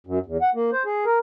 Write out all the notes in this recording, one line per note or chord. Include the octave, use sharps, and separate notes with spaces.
F#2
E2
F#5
A#3
C5
G#4
A#4